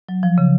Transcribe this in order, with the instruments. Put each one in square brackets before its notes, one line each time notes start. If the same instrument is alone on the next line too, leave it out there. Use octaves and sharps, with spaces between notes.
[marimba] F#3
F3
C#3